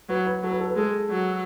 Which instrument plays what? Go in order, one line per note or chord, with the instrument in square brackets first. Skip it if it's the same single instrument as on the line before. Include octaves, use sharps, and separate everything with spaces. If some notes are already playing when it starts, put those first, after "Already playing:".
[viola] F#3 [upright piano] B4
[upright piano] B4
[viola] F#3 [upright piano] A4
[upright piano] B4
A4
B4
[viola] G#3 [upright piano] A4
[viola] F#3